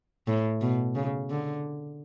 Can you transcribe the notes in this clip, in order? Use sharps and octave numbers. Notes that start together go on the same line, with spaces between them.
A2
B2
C#3
D3